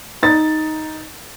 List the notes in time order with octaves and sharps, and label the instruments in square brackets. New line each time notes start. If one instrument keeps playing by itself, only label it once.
[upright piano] D#4 A6